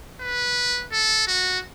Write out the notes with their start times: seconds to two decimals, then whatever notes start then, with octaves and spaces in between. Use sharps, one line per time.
0.21 B4
0.92 A4
1.27 F#4